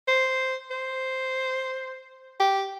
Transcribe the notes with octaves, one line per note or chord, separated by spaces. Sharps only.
C5
C5
G4